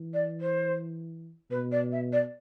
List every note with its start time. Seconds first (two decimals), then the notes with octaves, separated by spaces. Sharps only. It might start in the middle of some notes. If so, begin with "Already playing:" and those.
Already playing: E3
0.13 D5
0.40 C5
1.50 B2 B4
1.71 D5
1.92 E5
2.12 D5